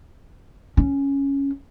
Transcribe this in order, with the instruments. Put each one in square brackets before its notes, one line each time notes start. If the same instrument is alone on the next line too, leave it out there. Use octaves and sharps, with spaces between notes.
[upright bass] C#4